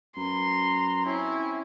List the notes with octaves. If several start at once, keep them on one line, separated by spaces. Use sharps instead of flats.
F#2 B4 A#5 C6
C4 C#4 E4